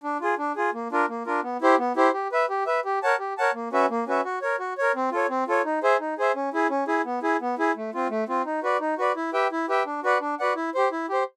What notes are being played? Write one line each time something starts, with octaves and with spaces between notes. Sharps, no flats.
D4
F4 G#4
D4
F4 G#4
A#3
D4 F4 A#4
A#3
D4 F4 A#4
B3
E4 G4 C5
B3
E4 G4 C5
G4
B4 E5
G4
B4 E5
G4
A#4 C#5 F#5 A5
G4
A#4 C#5 F#5 A5
A#3
C#4 F#4 B4 E5
A#3
C#4 F#4 B4 E5
F#4
A#4 C#5
F#4
A#4 C#5
C4
F4 A4 C#5
C4
F4 A4 C#5
D#4
G#4 C5 E5
D#4
G#4 C5 E5
C#4
E4 G#4
C#4
E4 G#4
B3
E4 G#4
B3
E4 G#4
A3
C4 F4
A3
C4 F4
D#4
F#4 B4 D5
D#4
F#4 B4 D5
E4
G4 B4 E5 G5
E4
G4 B4 E5 G5
D4
F#4 B4 D5 F#5
D4
F#4 B4 D5 F#5
E4
G4 C5
E4
G4 C5